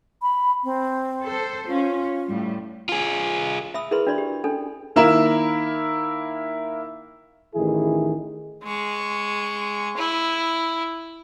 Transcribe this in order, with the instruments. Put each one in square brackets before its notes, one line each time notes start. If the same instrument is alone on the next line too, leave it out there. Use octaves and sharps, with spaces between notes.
[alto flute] B5
C4
[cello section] A4 C5
[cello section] C#4 [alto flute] F4
[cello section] A2 G3
[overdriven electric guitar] F4 G#4
[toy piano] E5 B5 D#6 E6
E4 G#4 A#4 B4 B5 C6
D4 F#4 A#4 D5 B5 C6
G4
C#4 D4 A4 G#5
[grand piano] D#3 A#3 E4 A#4 A#5 E7
[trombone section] A1 D#3 E3 E4 G#4
[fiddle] G#3 C#6
E4